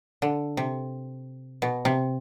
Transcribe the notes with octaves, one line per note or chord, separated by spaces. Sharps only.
D3
C3
B2
C3